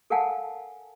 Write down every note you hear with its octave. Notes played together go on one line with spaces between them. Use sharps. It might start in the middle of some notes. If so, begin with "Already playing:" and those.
A4 A#4 F5 F#5 G#5 A5